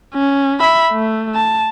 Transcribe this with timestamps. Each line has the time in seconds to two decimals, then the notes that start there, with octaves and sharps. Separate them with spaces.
0.15 C#4
0.60 E5 B5
0.92 A3
1.35 A5